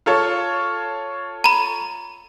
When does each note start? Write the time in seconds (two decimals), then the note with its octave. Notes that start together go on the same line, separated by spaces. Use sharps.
0.06 F4 A4 C#5
1.44 A#5 B5